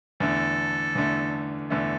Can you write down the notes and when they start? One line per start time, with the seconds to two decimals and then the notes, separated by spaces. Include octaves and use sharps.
0.20 E2 D3 A3 A4
0.95 E2 D3 A3
1.70 E2 D3 A3 A4